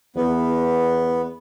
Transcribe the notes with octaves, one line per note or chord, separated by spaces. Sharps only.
E2 B3